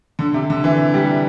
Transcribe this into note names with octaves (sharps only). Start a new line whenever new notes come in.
D3
C3
D3
E3
G3